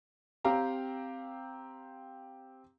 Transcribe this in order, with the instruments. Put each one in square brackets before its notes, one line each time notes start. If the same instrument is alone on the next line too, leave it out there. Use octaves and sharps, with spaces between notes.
[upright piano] C4 G4 F5 A#5